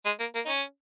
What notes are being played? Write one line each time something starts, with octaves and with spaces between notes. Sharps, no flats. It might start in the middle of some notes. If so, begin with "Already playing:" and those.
G#3
A#3
A#3
D#4
C#4